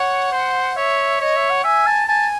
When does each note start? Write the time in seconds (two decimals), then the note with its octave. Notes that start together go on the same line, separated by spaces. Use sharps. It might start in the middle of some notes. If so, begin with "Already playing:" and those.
Already playing: C#5 F#5
0.32 C5
0.76 C#5 E5
1.20 C#5 D#5
1.36 E5
1.50 F#5
1.64 E5 G#5
1.86 A5
2.07 G#5 A5